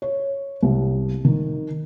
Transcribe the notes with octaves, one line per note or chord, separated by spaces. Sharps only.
C#5
C2
D#3